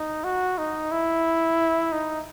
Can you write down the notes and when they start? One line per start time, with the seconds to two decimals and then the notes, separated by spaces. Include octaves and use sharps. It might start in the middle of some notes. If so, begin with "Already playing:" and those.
Already playing: D#4
0.24 F#4
0.58 D#4
0.92 E4
1.92 D#4